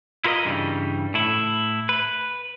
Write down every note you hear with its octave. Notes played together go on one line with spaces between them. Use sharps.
E4 F4 A#4 B4 D#5
G2 C#3 E3 G3
A2 E4
B4